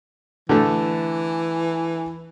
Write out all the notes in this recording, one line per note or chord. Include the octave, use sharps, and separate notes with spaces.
D3 E3 A3